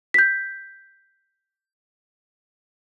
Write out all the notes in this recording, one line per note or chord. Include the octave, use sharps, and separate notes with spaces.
G6 B6